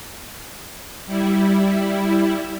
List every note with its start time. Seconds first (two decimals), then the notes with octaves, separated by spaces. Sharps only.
1.06 G3 E4